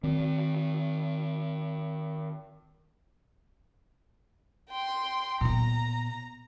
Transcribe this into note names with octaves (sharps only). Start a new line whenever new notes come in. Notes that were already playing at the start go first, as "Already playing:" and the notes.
D#3 C4
G5 C6
A#2 B3 A#5